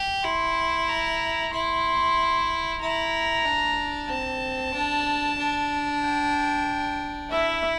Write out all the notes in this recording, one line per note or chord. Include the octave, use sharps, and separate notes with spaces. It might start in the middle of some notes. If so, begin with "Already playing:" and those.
Already playing: G4
E4 C6
A#5
E4 C6
E4 A#5
D4
C4 A5
D4
D4
G5
E4 E5